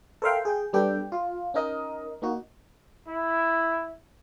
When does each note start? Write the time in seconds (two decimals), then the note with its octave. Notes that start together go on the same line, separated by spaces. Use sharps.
0.22 A4 A#4 C5 E5 F5 G5
0.45 G#4 G5
0.73 G3 B3 D4 G4 A4 G5
1.12 F4
1.54 C#4 D#4 A#4 D#5
2.22 A#3 D#4 F#4
3.08 E4